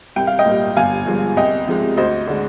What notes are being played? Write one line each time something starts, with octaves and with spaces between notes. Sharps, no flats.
C2 G5
F5
D#5 G5
A#2 G3
G1 F5 G#5
G2 F3 G#3
C2 D#5 G5
C3 F3 G#3
D2 C5 D#5
D3 G#3